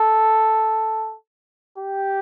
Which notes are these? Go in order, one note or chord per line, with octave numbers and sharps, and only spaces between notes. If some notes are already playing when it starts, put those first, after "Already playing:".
Already playing: A4
G4